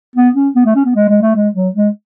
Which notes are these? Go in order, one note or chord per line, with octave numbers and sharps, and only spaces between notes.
B3
C#4
B3
A3
C#4
B3
G#3
G#3
A3
G#3
F#3
G#3